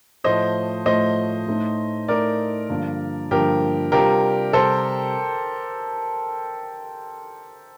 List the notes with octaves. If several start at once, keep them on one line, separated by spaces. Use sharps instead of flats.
A2 F3 A3 C5 D#5
A2 F3 A3 C5 D#5
A2 A3 D#4
A2 A3 D#4 A#4 D5
G2 D3 F3 A#3
G2 D3 F3 A#3 G4 A#4
C3 G3 D4 F4 G4 A#4
C3 G3 A4 C5